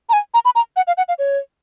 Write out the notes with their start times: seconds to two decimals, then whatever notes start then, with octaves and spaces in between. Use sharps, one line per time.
0.09 A#5
0.13 G#5
0.34 A#5
0.45 B5
0.55 A#5
0.76 F#5
0.87 F5
0.97 F#5
1.09 F5
1.19 C#5